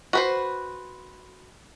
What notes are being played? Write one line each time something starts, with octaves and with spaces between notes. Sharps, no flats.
F#4 B4 C5